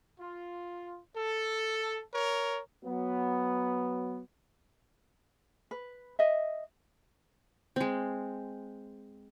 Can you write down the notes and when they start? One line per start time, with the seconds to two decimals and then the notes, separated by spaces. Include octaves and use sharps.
0.20 F4
1.15 A4
2.13 A#4 C#5
2.84 F#3 B3
5.71 B4
6.19 D#5 E5
7.76 G#3 C4